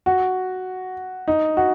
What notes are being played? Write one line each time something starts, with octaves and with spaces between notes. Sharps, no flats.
F#4
D#4
F#4